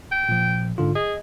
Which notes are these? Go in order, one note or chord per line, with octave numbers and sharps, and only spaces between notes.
G5
A#2 F3
G#2 D3 F4
G#4 D#5